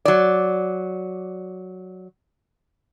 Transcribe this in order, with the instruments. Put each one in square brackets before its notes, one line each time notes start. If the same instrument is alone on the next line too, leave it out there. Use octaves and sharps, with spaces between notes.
[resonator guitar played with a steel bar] F#3 D5